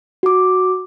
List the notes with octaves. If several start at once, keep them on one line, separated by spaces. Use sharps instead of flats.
F#4 D6